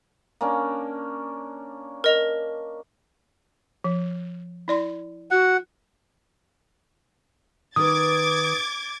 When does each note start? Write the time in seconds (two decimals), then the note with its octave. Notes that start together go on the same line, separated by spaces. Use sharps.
0.41 A#3 C#4 D4
2.04 A#4 D#5 F7
3.84 F3
4.68 E4 D5 C6
5.31 F#4 F#5
7.76 D#3 B4 D6 D#6 G#6 A6